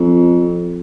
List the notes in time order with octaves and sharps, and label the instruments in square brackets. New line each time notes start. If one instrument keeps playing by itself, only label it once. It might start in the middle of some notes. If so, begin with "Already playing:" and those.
Already playing: [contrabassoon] F2